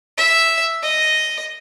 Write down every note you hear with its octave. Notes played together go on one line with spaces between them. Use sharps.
E5
D#5